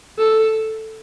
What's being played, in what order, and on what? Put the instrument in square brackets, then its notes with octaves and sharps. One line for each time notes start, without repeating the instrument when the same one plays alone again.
[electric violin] A4